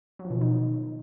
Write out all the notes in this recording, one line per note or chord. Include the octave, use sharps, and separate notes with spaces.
F#3
F3
B2
D#3
D#4